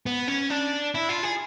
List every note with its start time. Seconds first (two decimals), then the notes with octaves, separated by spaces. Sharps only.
0.06 B3
0.28 C#4
0.50 D4
0.95 E4
1.09 F4
1.23 G#4